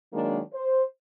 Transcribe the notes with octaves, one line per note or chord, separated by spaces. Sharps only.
D#3 F#3 G#3 A#3 D4 D#4
C5